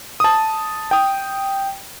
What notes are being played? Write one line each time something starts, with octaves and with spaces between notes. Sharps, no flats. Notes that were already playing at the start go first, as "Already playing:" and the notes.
A5 D#6
G5 D#6